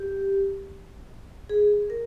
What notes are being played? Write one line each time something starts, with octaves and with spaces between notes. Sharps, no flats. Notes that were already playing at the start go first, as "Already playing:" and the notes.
Already playing: G4
G#4
A#4